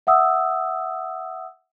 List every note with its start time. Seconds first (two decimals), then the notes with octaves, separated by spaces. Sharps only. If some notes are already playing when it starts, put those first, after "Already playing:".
0.07 E5 F#5 D#6 E6